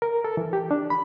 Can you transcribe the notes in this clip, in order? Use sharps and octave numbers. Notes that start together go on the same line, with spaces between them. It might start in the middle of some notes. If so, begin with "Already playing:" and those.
A#4
A4
E3
G4
D4
B5